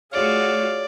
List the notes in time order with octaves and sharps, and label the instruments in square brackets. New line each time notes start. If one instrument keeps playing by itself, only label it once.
[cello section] A3 F4 F#4 [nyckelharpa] G#4 F5 [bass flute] C#5 [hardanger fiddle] D5